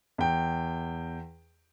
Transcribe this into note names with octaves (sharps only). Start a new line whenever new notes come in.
E2 G5